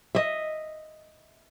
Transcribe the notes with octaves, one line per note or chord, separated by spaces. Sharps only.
D#5 E5